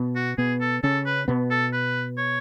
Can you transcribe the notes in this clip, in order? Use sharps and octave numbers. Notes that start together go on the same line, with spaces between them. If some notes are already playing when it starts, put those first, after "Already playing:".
Already playing: B2 B3
F#4
B2 B3 G#4
A4
C#3 C#4 A4
B4
B2 B3
A4
B4
C#5